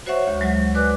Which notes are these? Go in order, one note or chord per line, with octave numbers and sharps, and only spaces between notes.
F#4 C5 C#5 E5 F#5 C#6
D2 G#3 G6
F#3 G#3
F#4 B4 D5 G#5 D6 F#6